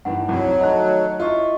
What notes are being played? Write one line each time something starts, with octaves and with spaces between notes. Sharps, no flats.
G2 D#3 E3 F#5
C2 F2 F#3
D#3 A3 D#5 A5 A#5 F#6
E4 F4 D#5 C#6